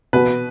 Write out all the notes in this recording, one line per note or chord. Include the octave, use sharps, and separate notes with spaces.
B2 B4